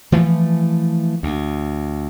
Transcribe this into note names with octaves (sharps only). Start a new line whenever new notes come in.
E3 F3 A3
D2